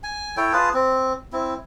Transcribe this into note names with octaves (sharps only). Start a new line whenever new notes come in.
G#5
E4 A4 C#5 G5
F4 G#4 B4 A5
C4
C4 E4